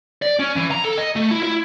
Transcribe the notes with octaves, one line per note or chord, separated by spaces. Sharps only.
D5
C#4
E3
A#5
A4
D#5
A3
E4
E4